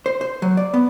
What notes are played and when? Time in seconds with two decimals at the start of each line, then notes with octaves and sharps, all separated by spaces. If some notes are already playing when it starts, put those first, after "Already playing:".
0.06 C5
0.21 C5
0.42 F#3
0.57 D5
0.74 B3